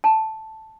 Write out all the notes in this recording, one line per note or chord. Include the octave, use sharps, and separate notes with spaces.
A5